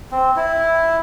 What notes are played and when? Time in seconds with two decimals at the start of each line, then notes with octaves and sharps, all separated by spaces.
0.11 C4
0.36 E4